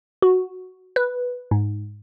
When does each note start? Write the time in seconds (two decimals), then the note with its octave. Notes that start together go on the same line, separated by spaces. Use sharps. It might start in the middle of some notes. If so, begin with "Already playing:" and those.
0.22 F#4
0.96 B4
1.51 G#2